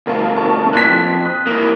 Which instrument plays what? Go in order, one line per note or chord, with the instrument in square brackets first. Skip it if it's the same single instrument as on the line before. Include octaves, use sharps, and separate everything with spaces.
[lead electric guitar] D2 B2 [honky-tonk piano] A#4 F5 A5
[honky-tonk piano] A#4 A5 C#6
[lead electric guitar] A#2 E3 [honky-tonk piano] F#6 B6
[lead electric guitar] F2
[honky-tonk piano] D#6 F#6
[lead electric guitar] E3 A#3 [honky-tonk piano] D#6